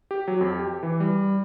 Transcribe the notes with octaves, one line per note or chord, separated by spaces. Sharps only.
G4
F#3
F2
G4
E3
G3